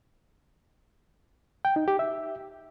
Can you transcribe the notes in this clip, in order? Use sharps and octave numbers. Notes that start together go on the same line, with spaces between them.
G5
D#4
G4
E5